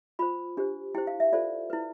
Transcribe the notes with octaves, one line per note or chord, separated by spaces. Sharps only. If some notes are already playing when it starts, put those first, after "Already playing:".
F4 C5 B5
D4 G4 C5
E4 G4 C5 G5
F5
E5
F4 A4 C5 D5
E4 B4